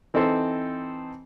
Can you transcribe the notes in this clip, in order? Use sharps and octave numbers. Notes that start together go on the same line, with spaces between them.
E3 C4 D#4 A4 C5